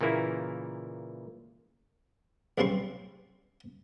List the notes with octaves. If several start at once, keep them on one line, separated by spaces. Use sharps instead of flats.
A#2 C#3 E3 A#3 E4
B1 C#3 G3 C4 C6 C#6